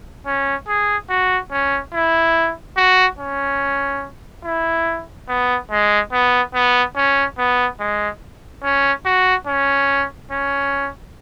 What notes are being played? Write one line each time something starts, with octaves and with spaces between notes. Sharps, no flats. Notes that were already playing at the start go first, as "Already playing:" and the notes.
C#4
G#4
F#4
C#4
E4
F#4
C#4
E4
B3
G#3
B3
B3
C#4
B3
G#3
C#4
F#4
C#4
C#4